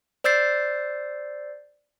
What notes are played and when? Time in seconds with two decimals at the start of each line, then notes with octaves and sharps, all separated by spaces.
0.24 C5 D5 E6 G6 A6 C7